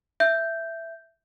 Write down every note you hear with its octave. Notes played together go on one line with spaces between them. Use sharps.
E5 G6